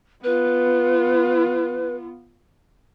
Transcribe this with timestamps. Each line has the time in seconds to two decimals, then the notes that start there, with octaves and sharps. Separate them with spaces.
0.24 B3 F4 B4